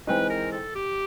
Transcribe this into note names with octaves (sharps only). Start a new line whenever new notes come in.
E3 G#3 C4 D#4 B4
A#4
A4
G4